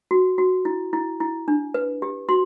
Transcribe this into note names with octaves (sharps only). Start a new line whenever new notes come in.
F#4
F#4
E4
E4
E4
D4
B4
G4
F#4 C6